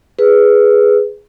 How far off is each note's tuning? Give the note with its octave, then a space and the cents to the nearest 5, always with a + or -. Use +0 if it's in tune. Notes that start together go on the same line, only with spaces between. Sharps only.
G#4 +0 B4 +0